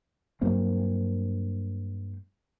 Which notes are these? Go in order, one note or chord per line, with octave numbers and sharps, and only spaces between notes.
G2 F#3 A#3 C4